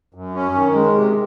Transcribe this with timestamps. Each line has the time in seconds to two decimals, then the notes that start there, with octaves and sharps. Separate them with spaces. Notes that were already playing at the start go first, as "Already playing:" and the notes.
0.14 F#2
0.35 C#4
0.54 D#3
0.74 G#3
0.94 C3